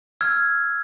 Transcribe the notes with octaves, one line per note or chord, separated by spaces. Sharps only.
E6 F6 G#6